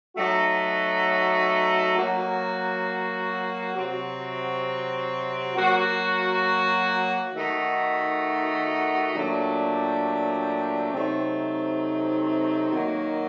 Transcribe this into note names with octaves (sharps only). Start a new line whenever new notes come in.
F#3 A3 D#4 F#4
F#3 A#3 F#4
C3 F#3 C4 F#4
F#3 A#3 F#4
D#3 A3 D#4 F#4
A#2 F#3 A3 D4 G4
C3 F#3 A3 C4 D#4
D#3 F#3 A#3 D#4 F#4